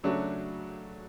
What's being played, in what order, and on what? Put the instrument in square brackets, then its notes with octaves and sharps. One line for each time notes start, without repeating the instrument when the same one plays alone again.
[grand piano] C#3 F#3 A3 D4 F#4